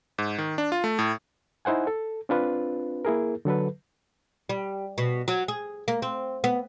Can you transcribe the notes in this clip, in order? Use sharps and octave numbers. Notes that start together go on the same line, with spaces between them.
G#2
D#3
D4
F4
A3
A2
D#4 E4 C5 F#5 G#5
A4
C4 D4 F4 B4
A#3 E4 G#4 A#4
D3 F#3 A4 B4
G3
B2
F#3
G#4
A#3
C4
B3